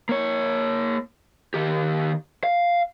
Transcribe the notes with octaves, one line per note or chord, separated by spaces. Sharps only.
A#3 C#5
D#3 G4
F5